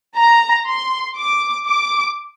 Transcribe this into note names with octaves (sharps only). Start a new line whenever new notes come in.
A#5
C6
D6
D6